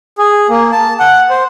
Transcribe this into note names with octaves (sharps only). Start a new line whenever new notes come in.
G#4
A#3
A5
F#5
C5